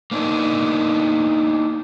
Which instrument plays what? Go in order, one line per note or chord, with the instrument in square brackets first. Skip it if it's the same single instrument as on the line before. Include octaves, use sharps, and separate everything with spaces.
[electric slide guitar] A#3 B3 D4 D#4